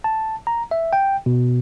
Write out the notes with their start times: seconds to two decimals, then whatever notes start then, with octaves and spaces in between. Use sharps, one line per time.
0.04 A5
0.47 A#5
0.71 E5
0.93 G5
1.26 B2